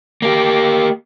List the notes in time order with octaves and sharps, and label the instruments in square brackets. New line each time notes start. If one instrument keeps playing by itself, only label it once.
[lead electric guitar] A#3 G4